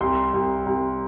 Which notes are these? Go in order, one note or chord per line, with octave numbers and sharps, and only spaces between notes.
C2 C6
C2
C2